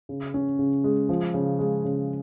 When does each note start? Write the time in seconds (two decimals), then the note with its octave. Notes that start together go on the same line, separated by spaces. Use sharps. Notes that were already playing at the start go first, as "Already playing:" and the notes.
0.09 C#3
0.34 C#4
0.59 C#3
0.84 G#3
1.09 F3
1.34 C#3
1.59 G#3
1.84 C#3